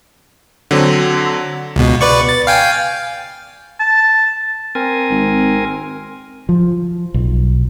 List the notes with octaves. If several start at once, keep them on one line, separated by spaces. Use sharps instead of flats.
D3 F#3 C4
C#2 B2
B4 D5 C#6
A6
F5 G5 G#5
A5
C4 A#4 G#5
G#1
F3
B1